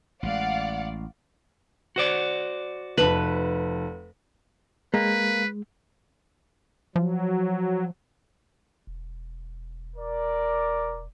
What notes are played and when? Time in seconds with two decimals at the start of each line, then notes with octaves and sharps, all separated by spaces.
0.23 A1 G#3 D5 F5 F#5
1.96 F#4 C5 D5
2.98 F1 B4 A5 E7
4.94 G#3 A#3 B4
6.96 F3 F#3
8.87 E1
9.96 A#4 D5